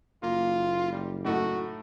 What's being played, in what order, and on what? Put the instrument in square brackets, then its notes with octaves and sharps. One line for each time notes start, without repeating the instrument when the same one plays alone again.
[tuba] F#1 [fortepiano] A#3 [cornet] F4
[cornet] G3
[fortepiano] A2 A3 D#4 [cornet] F#4